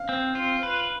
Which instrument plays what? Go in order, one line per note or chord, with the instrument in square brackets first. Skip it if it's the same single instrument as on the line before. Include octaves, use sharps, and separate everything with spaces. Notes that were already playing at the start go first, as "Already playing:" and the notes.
Already playing: [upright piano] F5
[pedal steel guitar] C4
F4
B4